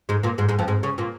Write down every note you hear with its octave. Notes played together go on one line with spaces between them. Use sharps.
G#2 G#3
A#2 A#3
G#2 G#3
G#2 G#3
F2 F3
G#2 G#3
C#3 C#4
A#2 A#3